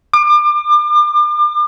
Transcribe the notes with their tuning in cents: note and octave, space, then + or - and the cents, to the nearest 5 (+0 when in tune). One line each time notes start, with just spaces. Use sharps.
D6 +35